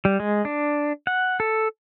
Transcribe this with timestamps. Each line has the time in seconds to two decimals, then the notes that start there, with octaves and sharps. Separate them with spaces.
0.05 G3
0.20 G#3
0.45 D4
1.07 F#5
1.40 A4